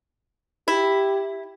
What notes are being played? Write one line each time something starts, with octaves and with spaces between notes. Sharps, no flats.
E4 G4